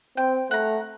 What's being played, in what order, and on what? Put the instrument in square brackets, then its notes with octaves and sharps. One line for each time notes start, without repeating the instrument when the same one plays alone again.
[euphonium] C4 [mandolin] G5
[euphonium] A3 [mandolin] F#5 A#5